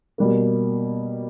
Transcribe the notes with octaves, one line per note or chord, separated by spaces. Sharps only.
B2 G3 A#3